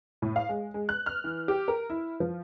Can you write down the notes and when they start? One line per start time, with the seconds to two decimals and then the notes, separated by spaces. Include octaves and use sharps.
0.22 A2
0.36 F5
0.49 G#3
0.74 G#3
0.89 F#6
1.06 F6
1.24 E3
1.48 G4
1.68 A#4
1.90 E4
2.20 F3